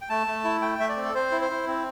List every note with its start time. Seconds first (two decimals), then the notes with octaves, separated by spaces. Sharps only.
0.02 G5
0.09 A3 A5
0.27 A3
0.44 E4
0.61 A3 G5
0.79 A3 E5
0.89 D5
0.96 C4
1.05 A4
1.15 C4 C5
1.32 E4
1.41 C5
1.50 E4
1.67 C4